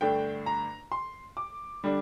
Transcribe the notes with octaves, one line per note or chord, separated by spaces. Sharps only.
G2 D3 A3 D4 G5
A#5
C6
D6
D3 G3 D4